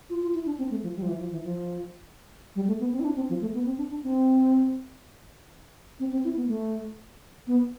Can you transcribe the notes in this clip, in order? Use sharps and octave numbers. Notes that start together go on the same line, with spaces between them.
F4
F4
E4
D4
C4
A3
F3
G3
F3
E3
F3
E3
F3
G3
A3
B3
C4
E4
D4
C4
F3
A3
B3
C4
D4
D4
C4
C4
C4
E4
B3
A3
B3